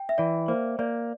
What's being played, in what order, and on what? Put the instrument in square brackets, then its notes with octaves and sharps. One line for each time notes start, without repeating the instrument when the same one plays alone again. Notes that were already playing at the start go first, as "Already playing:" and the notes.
Already playing: [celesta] G5
E5
[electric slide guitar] E3 [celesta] D5
[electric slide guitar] A#3 [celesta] C5
[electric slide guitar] A#3 [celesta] D5